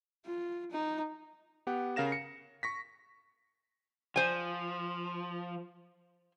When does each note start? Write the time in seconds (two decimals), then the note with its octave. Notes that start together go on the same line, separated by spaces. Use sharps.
0.25 F4
0.71 D#4
1.67 B3 G4 F#5
1.96 C#3 A#4 F5 A#6 E7
2.12 C#7
2.63 C#6 A#6 B6
4.16 F3 C5 G#5